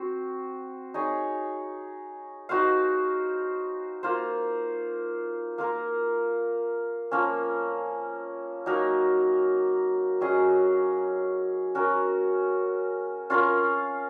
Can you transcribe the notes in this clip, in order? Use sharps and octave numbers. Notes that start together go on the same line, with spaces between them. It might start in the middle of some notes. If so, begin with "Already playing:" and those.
Already playing: C4 F#4 C5
D#4 G#4 C#5
D#4 F#4 C5 F5
A#3 F4 C5
A#3 F4 A#4
F3 A#3 C#4
F#3 A#3 D#4 A#4
F#3 C#4 G#4 D#5
C#4 F#4 A#4
C#4 F4 A#4 F5